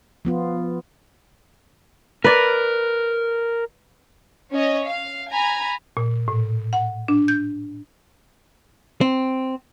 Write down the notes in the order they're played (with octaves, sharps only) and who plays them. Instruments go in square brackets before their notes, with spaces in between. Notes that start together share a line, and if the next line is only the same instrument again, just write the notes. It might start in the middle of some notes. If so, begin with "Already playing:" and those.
[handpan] F3 B3 F4
[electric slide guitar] A#4 [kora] B4 D5
[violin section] C#4 C#5 D#5
F5
G#5 A#5 B5
[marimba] A#2
A2
F#5
D4
G6
[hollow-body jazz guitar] C4